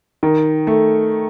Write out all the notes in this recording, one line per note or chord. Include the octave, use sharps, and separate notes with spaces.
D#3
A3